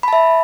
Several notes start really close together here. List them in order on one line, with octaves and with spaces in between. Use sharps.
B5 A5 E5